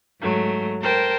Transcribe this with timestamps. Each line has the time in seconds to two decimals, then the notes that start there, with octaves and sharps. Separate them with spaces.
0.21 G#2 F#3 A3
0.81 A#4 C5 G5 A5